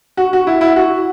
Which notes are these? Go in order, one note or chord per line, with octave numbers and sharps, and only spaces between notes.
F#4
F#4
E4
E4
F#4